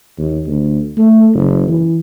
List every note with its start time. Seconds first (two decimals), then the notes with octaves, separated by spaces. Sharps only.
0.18 D#2
0.47 D2
0.97 A3
1.34 F#1
1.68 E3